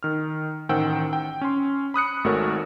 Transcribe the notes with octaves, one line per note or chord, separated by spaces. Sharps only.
D#3 F6
A1 D#3 C5 F#5 G5 E6
G5
C#4 C6
B5 D#6 F#6 C#7
G#1 A3 F#4 A#4 C#5